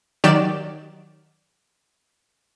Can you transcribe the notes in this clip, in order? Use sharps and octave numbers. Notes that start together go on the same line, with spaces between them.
D#3 F#3 G4 D5 E7